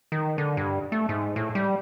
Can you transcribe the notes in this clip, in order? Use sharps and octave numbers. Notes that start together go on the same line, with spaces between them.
D#3
D3
G2
A3
G#2
A2
G3